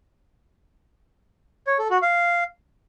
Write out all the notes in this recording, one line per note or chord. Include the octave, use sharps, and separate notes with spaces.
C#5
A4
F#4
F5